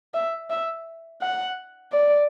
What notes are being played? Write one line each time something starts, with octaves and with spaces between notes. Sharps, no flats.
E5
E5
F#5
D5